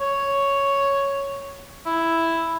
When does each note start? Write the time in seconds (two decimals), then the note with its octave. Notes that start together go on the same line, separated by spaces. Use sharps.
0.01 C#5
1.86 E4